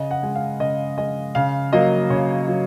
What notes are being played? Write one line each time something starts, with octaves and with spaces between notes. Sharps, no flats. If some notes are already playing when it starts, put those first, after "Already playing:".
Already playing: C#3 D#5
F#5
G#3
F5
C#3 D#5
G#3 D#5
C#3 F5
F#3 A#3 D#5
C#3 C#5
F#3